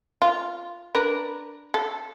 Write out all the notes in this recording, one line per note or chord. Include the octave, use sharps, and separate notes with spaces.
F4
D4 A#4 B4
A4